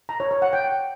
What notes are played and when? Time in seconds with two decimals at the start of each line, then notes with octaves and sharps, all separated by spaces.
0.09 A#5
0.20 C#5
0.31 C#5
0.42 F#5
0.53 G5